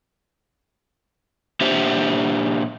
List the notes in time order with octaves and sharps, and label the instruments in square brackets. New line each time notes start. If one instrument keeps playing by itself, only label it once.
[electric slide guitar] A#2 D4 G4 C5 E5